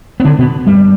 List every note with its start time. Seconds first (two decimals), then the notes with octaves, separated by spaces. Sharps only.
0.20 B3
0.25 D3 D4
0.39 B2 B3
0.67 G2 G3